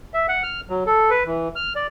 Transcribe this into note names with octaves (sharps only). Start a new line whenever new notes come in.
E5
F#5
F6
F#3
A4
B4
E3
F6
D5